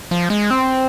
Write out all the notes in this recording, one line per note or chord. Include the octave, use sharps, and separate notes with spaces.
F3
G#3
C4